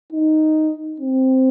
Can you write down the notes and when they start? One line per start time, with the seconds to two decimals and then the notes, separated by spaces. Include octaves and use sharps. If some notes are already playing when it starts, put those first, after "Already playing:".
0.12 D#4
1.00 C4